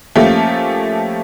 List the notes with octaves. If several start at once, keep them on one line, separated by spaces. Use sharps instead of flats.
F3 A3 A#3 C#4 G4